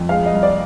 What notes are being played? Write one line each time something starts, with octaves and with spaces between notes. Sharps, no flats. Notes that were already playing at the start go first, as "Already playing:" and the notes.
Already playing: F2
G#3 F5
D#5
C2
D5